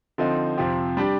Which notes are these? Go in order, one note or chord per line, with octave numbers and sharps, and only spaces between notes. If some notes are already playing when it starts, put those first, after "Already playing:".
D3 F3 C4 D#4
F2 C3 F3 C4 G4
G3 D4 G4 D5